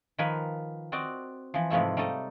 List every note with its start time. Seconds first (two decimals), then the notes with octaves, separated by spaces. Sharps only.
0.18 D#3 F3 A#4 B4 G#5 B5
0.92 C4 F#4 D5 D#5
1.54 E3 F3
1.70 G#2 C3 F3 A3 E4
1.97 G3 A3 D#4 A4 D#5